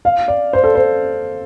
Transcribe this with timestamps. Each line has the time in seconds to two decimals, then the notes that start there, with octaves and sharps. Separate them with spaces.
0.05 F5
0.28 D5
0.53 C5
0.64 A4
0.75 C5